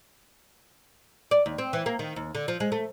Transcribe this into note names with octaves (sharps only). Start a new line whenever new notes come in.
D5
D#2
C4
E3
A#3
D#3
D#2
D3
F3
G#3
A3